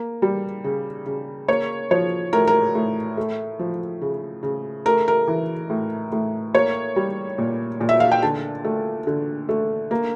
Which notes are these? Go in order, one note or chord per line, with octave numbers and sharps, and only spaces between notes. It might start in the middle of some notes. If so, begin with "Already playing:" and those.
Already playing: A#3
G3
C#3
C#3
A#3 C#5
F3 C#5
A2 A#4
A#4
A2
A3
F3
C#3
C#3
A3 A#4
A#4
E3
A2
A2
A#3 C#5
G3
A#2
A#2
E5
F5
G5
D3 A5
A3
D3
A3
A#3